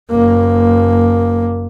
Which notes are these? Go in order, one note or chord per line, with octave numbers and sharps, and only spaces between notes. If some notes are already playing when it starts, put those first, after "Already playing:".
F#1 A#3